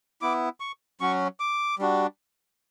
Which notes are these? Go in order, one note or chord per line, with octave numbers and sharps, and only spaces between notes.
B3 E4 D6
C#6
F#3 C#4 F#4 C#6
D6
G3 D4 F#4